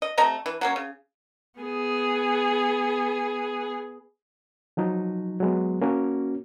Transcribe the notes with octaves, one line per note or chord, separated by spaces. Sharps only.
D#5
C3 A3 D#5 A#5
E3
F#3 A#3 C#4
C#3
B3 G#4
F3 F#3 D#4
F#3 G#3 B3
A#3 C#4 F#4